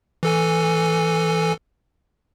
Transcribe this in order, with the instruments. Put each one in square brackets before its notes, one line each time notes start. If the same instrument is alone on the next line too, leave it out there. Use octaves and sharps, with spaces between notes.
[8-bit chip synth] E3 A4 G#5